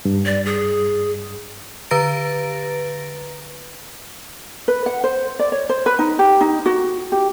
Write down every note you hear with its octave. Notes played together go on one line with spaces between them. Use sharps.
G2
D5
G#4
D3 B4 A#5 A6 A#6 D7
B4
F#5
C5
D5
C#5
C5
B4
D#4
G4
D#4
F#4
G4